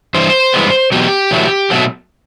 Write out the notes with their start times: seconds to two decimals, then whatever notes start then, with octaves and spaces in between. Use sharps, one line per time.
0.14 G2 E3 C5
0.54 G2 E3 G#3 B3
0.92 E2 B2 F#3 G4
1.31 E2 B2 F#3 A3
1.70 B2 F#3 A3